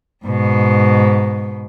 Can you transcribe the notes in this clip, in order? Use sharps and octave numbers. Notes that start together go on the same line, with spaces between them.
G#2 B2